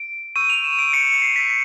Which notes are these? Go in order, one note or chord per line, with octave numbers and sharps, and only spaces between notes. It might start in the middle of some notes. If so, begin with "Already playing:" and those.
Already playing: D7
C#6 E6 G6 D#7
F7
E7
D7
C#6 E6 G6 C#7
C7
B6